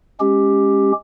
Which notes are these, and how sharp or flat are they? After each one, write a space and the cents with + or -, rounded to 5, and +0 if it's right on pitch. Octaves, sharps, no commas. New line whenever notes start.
G#3 +0 C#4 +0 G4 +5